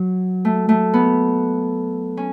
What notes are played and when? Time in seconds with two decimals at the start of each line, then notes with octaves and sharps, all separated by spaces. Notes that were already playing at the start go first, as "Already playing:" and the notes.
Already playing: F#3
0.45 A3
0.69 A3
0.94 B3
2.17 C#4